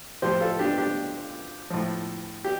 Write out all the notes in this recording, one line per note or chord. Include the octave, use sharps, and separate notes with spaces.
A2 F3 G4 C5
F4 A4
D4 G4
D4 G4
A2 F3
G4